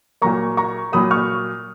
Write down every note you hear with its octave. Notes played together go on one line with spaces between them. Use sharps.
A#2 F#3 A#3 A#5 C#6
A#5 C#6
A#2 F#3 A#3 B5 D#6
C#6 F6